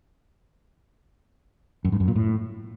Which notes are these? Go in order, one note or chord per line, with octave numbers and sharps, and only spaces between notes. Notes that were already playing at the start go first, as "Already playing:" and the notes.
F#2
G2
F#2
A#2
A2